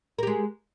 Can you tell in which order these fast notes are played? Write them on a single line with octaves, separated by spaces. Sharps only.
A#4 G4 G#3